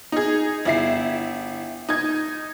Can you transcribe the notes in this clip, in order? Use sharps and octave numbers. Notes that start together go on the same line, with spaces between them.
D#4 G#4
G1 E4 C7
D#4 G#6